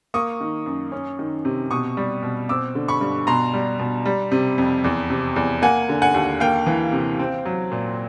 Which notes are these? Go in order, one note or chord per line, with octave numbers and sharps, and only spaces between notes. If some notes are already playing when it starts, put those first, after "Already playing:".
A#3 C#6 D#6
D#3
F#2
C#4
D#3
C3
B2 C#6 D#6
G3
B2
C4 D6 E6
D3
B5 C#6
G2
B2 A#5 C6
G3
B2
G3
C3
F2
E2
C3
E2
A#3 F#5 G#5
D3
F#5 G#5
D#2
A#3 F5 G5
E3
C3
C4
F#3
A#2